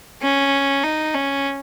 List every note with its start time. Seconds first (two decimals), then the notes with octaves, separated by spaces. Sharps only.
0.22 C#4
0.83 D#4
1.14 C#4